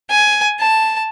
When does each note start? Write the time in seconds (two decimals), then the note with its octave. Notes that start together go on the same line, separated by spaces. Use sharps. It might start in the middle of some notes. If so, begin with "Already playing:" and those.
0.11 G#5
0.60 A5